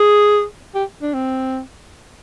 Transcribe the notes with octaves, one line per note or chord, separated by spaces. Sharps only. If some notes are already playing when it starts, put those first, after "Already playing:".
Already playing: G#4
G4
D4
C4